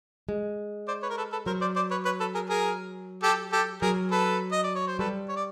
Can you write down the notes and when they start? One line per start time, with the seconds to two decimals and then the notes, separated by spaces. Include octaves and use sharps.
0.29 G#3
0.88 C5 D5
1.02 B4 C#5
1.10 A#4
1.17 A4 B4
1.32 A4 B4
1.46 F#3 A#4 C5
1.61 C5 D5
1.76 C5 D5
1.91 B4 C#5
2.05 B4 C#5
2.20 A4 B4
2.34 G#4 A#4
2.49 G#4 A#4
3.23 G4 A4
3.52 G4 A4
3.82 F#3 G#4 A#4
4.11 A4 B4
4.52 D#5
4.63 D5
4.75 C#5
4.87 C5
4.99 G3 A4 B4
5.29 C#5
5.36 D5